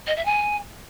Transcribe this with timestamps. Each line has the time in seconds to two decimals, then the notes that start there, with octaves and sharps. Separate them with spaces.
0.07 D#5
0.16 E5
0.25 G#5